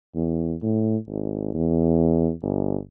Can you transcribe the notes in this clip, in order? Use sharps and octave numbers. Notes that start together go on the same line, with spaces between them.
E2
A2
G#1
E2
G1